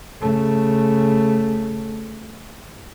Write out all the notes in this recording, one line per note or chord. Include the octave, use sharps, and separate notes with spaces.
C#3 A3